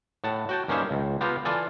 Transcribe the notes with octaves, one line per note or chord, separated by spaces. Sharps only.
A2 F#5 A5
F#4 G5 A5
G2 A#3 C#4 D#4 C5 E5
C#2
B3 F4 G4 F5 A5 A#5
E3 F4 A4 D5 G#5